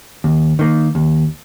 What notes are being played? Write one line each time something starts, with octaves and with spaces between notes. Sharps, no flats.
D#2
D#3 A#3
D#2